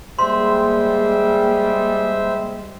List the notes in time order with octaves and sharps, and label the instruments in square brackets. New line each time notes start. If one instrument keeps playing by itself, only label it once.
[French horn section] G3 G#3 [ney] A#3 [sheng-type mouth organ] C5 E5 [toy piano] C6